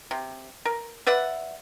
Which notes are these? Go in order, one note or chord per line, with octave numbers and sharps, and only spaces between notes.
C3
A#4
B4 D5 E5 F#5